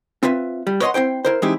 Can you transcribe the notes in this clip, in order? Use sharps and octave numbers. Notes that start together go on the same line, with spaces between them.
C4 F4 B4 E5
G3
B4 C#5 D#5 F5 F#5 C6
C4 E4 C5 G5
E4 A#4 C5
E3 G#3 C4 D#4 E4 G4